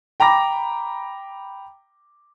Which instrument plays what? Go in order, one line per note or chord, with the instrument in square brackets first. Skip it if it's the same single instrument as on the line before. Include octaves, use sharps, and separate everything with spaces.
[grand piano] G5 A#5 B5 D6 A#6